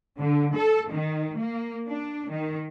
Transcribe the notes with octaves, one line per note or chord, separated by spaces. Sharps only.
D3
A4
D#3
A#3
D4
D#3